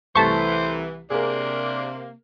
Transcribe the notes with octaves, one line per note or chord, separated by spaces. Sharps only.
C2 E3 A3 C5 A5 C#6 B6
C3 A#3 D4 G#4 A#4